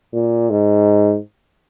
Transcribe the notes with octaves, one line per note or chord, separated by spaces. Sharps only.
A#2
G#2